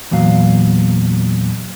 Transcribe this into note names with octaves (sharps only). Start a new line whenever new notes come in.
E2 A#2 F#3 F5